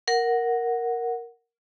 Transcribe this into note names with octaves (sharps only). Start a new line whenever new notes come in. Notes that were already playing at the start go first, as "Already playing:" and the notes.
A#4 F#5